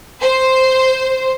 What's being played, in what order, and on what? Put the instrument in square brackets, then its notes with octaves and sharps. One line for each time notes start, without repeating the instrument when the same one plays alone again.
[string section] C5